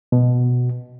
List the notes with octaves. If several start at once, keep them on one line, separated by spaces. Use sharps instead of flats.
B2